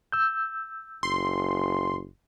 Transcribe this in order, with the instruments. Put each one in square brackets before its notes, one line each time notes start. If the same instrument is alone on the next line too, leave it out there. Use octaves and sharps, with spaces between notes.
[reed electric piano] E6 G6
[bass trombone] F#1 [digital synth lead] C6